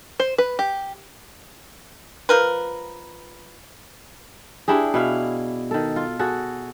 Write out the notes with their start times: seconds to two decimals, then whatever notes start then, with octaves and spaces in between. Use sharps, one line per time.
0.20 C5
0.38 B4
0.59 G4
2.29 F3 A#4 B4
4.68 D4 E4 G4 G#4
4.94 B2 E4 F5
5.71 D#3 A4
5.96 F4
6.19 F#4 G#4 A4